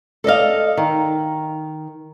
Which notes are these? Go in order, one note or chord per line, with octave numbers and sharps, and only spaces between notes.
A4 D5 D#5 F5
D#3